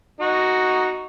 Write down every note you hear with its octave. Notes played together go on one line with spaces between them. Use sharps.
D#4 F#4